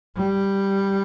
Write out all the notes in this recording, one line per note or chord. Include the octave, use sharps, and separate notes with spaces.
G3